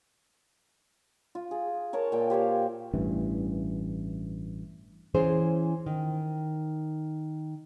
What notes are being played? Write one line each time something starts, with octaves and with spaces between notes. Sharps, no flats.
F4
G#4
A#4 C#5 A5 A#5
A#2 G5
G4 C5 C#5 F5
A1 G2 E3
E3 C#4 G#4 C5
D#3